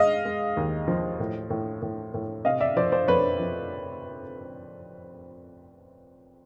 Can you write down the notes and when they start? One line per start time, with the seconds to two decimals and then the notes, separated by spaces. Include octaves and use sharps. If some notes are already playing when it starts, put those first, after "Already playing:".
Already playing: G#3 D#5 F5
0.25 G#3
0.57 D#2
0.88 F3
1.20 A2
1.50 A2
1.82 A2
2.14 A2
2.45 C3 D#5 F5
2.61 D5 E5
2.77 F3 C5 D5
2.92 C5 D5
3.08 F2 B4 C#5
3.40 F3